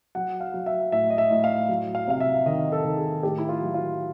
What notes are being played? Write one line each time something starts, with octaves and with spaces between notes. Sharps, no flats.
F#3 F#5
F5
F#3
E5
A2 E5
D#5
E5
A2
F5
F#3
F5
C3 F5
E5
D#3 D#5
A4
D#3
G#4
A2 G4
E4
F4
F#3
F4